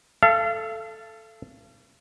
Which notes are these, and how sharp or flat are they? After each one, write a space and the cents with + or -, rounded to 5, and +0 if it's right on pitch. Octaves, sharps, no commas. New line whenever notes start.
A4 +0 F5 -40